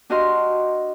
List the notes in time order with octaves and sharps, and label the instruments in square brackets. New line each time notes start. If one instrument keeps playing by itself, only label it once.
[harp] D4 F#4 G4 D#5 F5 C6